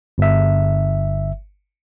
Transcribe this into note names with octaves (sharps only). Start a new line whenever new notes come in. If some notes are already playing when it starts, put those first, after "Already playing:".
G1 E5